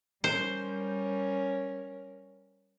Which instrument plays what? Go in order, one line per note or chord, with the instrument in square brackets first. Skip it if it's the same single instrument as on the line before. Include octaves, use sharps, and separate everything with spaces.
[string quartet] G3 C#4 A#4 [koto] C5